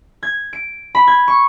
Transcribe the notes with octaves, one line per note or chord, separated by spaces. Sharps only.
G#6
D7
B5
G#6
C#6